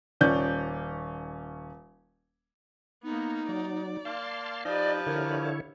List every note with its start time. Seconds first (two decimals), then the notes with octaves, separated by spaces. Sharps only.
0.21 D#1 C#4 D5 G6
3.04 A#3 B3 D#4
3.49 F#3 D5
4.05 A#3 F5 A5 C6
4.65 F3 D#4 G4 B4 D5 D#5
5.07 D3 E4 A#4 C#5